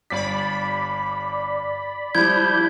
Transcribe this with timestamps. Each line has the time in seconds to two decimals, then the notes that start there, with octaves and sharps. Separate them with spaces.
0.10 G1 D5 B5 B6
2.15 F3 G3 E4 G6 G#6